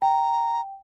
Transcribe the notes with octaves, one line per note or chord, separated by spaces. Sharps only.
G5 A#5